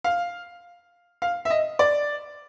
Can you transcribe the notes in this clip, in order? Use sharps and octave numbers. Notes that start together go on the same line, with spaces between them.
F5
F5
E5
D#5
D5